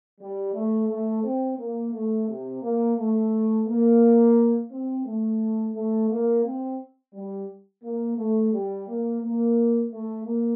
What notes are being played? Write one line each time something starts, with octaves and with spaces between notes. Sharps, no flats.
G3
A3
A3
C4
A#3
A3
C3
A#3
A3
A#3
C4
A3
A3
A#3
C4
G3
A#3
A3
G3
A#3
A#3
A3
A#3